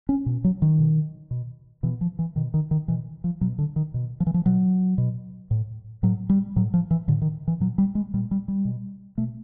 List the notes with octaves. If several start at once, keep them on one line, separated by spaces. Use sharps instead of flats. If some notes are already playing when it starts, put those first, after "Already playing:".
C#4
B2
F#3
D#3
B2
B2
B2 E3
F3
E3
B2 D#3
D#3
D#3
B2 E3
F3
B2 F#3
D3
D#3
B2
F3
E3
F3
B2 F#3
B2
A2
A2 F#3
G3
A2 F#3
F3
E3
A2 D3
D#3
E3
A#2 F#3
G3
G#3
A#2 G3
G3
G3
B2
B2 A3